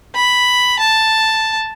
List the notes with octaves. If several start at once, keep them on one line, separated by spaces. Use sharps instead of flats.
B5
A5